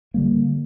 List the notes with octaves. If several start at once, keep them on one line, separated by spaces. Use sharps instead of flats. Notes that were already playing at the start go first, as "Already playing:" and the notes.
D3 G3 A#3